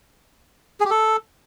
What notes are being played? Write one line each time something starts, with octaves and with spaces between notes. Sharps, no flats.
G#4
G4
A4